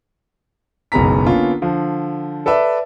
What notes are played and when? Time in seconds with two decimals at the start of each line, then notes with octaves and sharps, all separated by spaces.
0.92 F#1 B1 G#3 B3 A#5 B6
1.26 D3 A#3 B3 C#4 F4
1.62 D3 F3
2.46 A4 B4 D5 E5